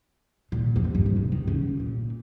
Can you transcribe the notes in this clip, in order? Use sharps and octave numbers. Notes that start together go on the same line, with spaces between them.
A#2
F2
G2
G2
G#2
C3
D#3
C#3
A#2